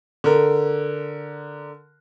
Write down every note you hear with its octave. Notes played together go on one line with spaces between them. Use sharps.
D3 A#4